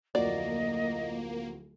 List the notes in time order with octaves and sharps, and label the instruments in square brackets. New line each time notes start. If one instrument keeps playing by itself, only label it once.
[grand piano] D1 F2 F#4 [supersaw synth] A#3 [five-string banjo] D5 [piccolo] D#5